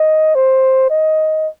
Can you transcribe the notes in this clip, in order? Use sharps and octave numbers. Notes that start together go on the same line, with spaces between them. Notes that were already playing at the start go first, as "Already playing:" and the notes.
Already playing: D#5
C5
D#5